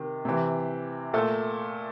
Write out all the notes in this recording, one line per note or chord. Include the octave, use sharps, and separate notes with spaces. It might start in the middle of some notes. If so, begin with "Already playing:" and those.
Already playing: C3 D#3
C3 E3
A#2 A3 A4